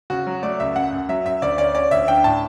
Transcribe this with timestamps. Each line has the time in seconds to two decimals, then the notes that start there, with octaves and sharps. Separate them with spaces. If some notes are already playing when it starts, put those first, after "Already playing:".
0.10 C#3 F#4
0.27 F#3
0.43 A3 D5
0.60 C#2 E5
0.76 F#2 F#5
0.93 F#2
1.09 F#3 E5
1.26 F#2 E5
1.42 D2 D5
1.58 C#4 D5
1.75 C#4 D5
1.91 D2 E5
2.08 D4 G5
2.24 A2 A5